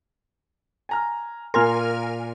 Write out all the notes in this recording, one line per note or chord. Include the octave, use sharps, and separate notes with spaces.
G#5 A#5 F6
A#2 F4 A#4 G#5 C6 F6